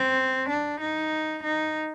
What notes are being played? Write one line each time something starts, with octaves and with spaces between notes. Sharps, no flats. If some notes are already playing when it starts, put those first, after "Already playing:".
Already playing: C4
D4
D#4
D#4